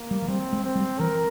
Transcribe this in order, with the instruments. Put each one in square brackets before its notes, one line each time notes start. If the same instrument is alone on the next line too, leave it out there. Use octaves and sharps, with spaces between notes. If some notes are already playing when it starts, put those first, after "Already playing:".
Already playing: [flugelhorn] A#3
[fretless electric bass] G3
F3
[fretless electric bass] G3 [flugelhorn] C4
[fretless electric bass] G#3
[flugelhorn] C4
[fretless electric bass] G3
[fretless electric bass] E3 [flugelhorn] A#4